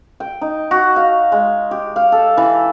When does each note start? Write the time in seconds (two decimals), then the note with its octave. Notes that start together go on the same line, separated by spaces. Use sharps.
0.20 G5
0.41 D#4
0.71 F#4
0.96 F5
1.32 G#3
1.71 G4
1.96 F5
2.12 A4
2.37 E3